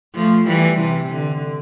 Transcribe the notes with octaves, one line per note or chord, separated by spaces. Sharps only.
F3 A3
E3 G3
C3 E3
D3